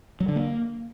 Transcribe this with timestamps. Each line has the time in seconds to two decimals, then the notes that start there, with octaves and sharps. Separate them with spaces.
0.20 F#3
0.28 D3
0.36 A#3